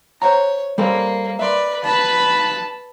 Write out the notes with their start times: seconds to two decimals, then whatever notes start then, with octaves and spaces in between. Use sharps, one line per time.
0.22 C5 C#5 F#5 A#5
0.78 G3 A#3 A4 C5
1.39 B4 D5 E5 C6
1.84 B4 A5 B5